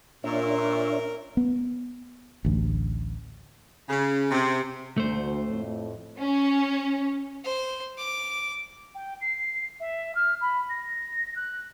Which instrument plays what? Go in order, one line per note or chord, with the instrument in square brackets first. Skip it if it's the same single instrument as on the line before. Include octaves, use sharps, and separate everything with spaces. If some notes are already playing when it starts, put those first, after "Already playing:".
[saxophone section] A#2 [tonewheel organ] D4 C#5 E5 [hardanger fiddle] A#4
[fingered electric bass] B3
A1 D2
[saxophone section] C#3
C3
[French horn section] D2 [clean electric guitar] A3 C5
[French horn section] F2 A2
[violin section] C#4
[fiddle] C5
D6
[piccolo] G5
C7
E5
F6
B5
A#6
F#6